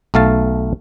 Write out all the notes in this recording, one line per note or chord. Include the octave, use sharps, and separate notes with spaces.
B1 A3 F5 A5